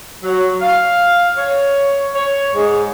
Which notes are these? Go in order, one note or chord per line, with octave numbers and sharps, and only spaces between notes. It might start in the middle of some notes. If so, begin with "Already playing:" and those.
F#3
F5
C#5
C#5
G#2